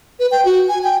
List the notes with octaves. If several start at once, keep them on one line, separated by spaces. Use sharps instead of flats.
B4
G5
F#4
G#5
G5